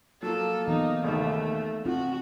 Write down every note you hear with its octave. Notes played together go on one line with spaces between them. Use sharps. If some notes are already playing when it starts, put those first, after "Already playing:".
F3 F#3 A#3 A4
E3 B3 D#4
A#1 D#2 A3
F3 C4 F#4